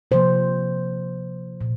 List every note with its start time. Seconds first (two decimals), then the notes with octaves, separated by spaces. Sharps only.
0.11 C3 F3 A#3 C5
1.61 A#2